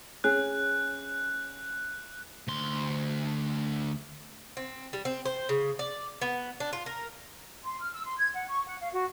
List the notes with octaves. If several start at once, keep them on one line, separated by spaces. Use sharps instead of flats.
C#4 G#4 F#6
D2 C6
C4
G3
C4
C5
C#3
D5
B3
D4
F4
A#4
C6
F6
E6
C6
G#6
F#5
C#6
F#5
F5
F#4